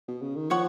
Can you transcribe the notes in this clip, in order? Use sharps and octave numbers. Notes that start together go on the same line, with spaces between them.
B2
C#3
D#3
F3 C#5 F#5 C#6